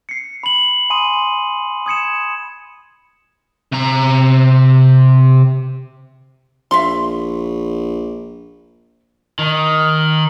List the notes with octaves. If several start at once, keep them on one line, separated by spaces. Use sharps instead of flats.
C7 C#7
B5 F#7
G#5 B5 C6 D#6 D#7
D#6 G#6 C#7 E7
C3 A#5
A#1 E5 F5 C6
D#3